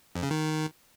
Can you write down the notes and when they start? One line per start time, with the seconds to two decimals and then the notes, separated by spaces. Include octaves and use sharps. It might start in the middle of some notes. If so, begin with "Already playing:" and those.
0.15 F2
0.23 C#3
0.31 D#3